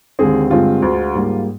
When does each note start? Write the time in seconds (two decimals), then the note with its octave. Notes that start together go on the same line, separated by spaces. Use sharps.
0.19 D#2 D3 G#3 C4 G#4
0.50 G2 D3 G#3 C4 F4
0.82 D2 D3 G#3
1.14 G#2 G3 A#3